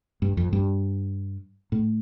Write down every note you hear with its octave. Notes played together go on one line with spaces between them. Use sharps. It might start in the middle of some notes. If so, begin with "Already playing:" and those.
G2
F2
G2
A2